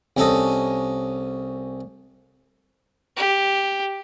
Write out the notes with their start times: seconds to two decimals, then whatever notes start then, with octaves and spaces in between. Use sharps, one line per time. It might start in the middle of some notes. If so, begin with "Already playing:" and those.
0.17 C2 C#4 A4 D#5
3.17 G4